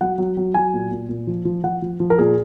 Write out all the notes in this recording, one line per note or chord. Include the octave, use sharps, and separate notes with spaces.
F#3 F#5
F#3
F#3
F#3 G#5
A#2
A#2
A#2
F3
F3
F3 F#5
F3
F3
A#4
A#2 G#4